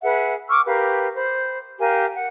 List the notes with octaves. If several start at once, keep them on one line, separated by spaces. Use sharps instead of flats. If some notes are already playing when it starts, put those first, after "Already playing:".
G#4 B4 E5 F#5
C#6 D6 E6 F6
G4 A#4 B4 F5
C5 B5
G4 A#4 F5 G#5
F#5